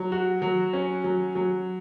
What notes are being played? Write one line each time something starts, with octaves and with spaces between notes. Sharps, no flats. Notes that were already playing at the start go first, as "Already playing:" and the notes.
Already playing: F#3
F#4
F#3
C#4
F#3
F#3